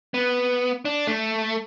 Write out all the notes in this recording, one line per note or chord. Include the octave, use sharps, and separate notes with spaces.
B3
D4
A3